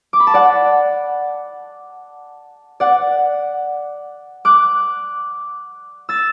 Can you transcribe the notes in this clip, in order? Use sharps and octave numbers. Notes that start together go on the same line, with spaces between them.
D6
B5
A5
D5 F#5
D5 F#5
D6 F#6
E6 A6